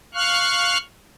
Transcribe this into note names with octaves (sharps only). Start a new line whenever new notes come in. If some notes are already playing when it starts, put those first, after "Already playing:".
F5 C#6 F6 F#6